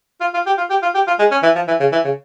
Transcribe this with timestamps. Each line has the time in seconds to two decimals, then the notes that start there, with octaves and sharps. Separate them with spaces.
0.21 F4
0.34 F4
0.46 G4
0.58 F4
0.70 G4
0.83 F4
0.95 G4
1.07 F4
1.19 G#3
1.31 C#4
1.43 E3
1.55 F3
1.68 E3
1.80 C#3
1.92 E3
2.04 C#3